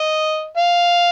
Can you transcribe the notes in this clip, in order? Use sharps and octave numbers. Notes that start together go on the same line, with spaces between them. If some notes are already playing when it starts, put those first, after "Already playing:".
Already playing: D#5
F5